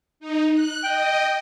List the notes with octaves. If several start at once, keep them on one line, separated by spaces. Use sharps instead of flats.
D#4
F#6
D#5 G5